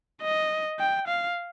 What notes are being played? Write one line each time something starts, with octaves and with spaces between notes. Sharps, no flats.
D#5
G5
F5